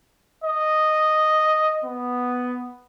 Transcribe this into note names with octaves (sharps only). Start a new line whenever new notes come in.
D#5
B3